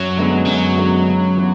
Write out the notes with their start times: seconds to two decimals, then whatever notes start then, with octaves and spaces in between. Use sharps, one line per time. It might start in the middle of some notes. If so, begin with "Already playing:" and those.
Already playing: F#2 F#3
0.16 D3 G#3 B3
0.46 F#2 F#3
0.77 D3 G#3 B3
1.07 C#3
1.37 E3 B3